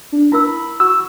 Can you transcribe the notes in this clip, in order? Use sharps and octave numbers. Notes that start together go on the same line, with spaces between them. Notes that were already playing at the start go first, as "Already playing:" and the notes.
D4
E4 A#4 B5 E6
F#4 C#6 E6